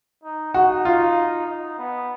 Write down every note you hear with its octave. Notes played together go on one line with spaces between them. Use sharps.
D#4
D#4 F#4
F4
D#4
B3